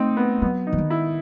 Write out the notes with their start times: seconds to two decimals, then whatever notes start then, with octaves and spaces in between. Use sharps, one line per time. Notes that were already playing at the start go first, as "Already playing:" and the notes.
Already playing: A3 C4 D#4
0.17 B3
0.42 F#3 B3
0.67 D#4
0.73 E3
0.78 D#3
0.90 E4